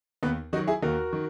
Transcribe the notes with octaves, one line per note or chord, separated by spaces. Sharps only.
D#2 B3
D#3 F#3 D#4 F#4
E4 G#4
D#2 F#4 A#4
D#3